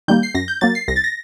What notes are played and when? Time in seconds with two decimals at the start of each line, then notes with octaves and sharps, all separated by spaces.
0.08 D#3 G3 A#3 G6
0.23 C7
0.34 F#2 A#6
0.48 G6
0.61 F#3 A#3 A6
0.75 C7
0.88 C2 A#6
0.96 A6
1.04 A#6